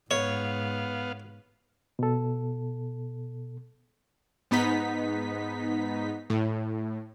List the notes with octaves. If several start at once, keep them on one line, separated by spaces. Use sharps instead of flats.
G#2 B3 C#5 F5
B2 A4
G#2 B3 D#4 B6
A2